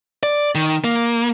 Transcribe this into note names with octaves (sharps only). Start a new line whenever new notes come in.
D5
D#3
A#3